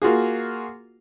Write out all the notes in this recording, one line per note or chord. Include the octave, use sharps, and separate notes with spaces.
A#3 F4 F#4 G#4